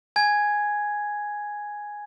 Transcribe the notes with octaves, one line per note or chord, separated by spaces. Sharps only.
G#5 G#6